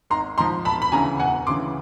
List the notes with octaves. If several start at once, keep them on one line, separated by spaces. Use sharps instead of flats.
G#1 A#5 C6
G#2 F3 A#5 C6
E1 A5 B5
B5
D2 C#3 E3 G#5 A#5
E1 F#5 G#5
D2 C#3 E3 C6 D6